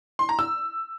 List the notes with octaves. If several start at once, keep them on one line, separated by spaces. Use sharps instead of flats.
C6
A#5
E6